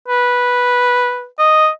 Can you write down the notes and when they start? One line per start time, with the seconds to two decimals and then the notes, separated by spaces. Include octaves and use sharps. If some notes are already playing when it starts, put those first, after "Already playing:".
0.08 B4
1.39 D#5